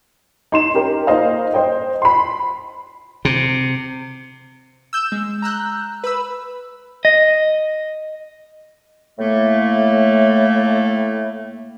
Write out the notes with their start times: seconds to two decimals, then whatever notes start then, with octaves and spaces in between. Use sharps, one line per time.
0.52 D#4 C6 E7
0.74 C#4 G4 A#4
1.07 A#3 D#4 C5 D#5 F5
1.54 C5 D#5 G5
2.02 B5 C6
3.25 C3
4.93 E6 G6 E7
5.12 G#3
5.42 A#5 E6 F#6 G6
6.04 B4 B5 E6
7.05 D#5
9.18 A2 A3 A#3